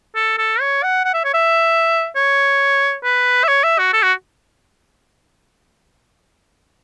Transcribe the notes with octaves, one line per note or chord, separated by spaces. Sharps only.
A4
A4
C#5
F#5
F#5
E5
C#5
E5
C#5
B4
E5
C#5
E5
F#4
A4
F#4